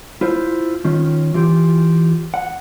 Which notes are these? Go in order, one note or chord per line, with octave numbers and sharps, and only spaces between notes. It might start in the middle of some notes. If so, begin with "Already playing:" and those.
E4 F4 C5
D#3 C#4 F4
E3 F4 G4
F#5